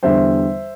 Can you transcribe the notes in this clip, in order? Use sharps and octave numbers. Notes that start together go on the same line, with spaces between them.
E2 D3 G3 C5 E5